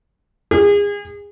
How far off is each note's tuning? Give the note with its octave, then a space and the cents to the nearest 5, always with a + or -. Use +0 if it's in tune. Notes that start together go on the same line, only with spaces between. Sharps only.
G#4 -30